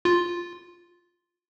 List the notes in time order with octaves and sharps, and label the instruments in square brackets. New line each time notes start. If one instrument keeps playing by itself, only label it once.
[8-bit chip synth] F4